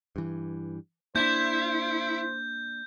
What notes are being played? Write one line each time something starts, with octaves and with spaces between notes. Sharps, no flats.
G2 E3
A#3 D4 E4 C5 G6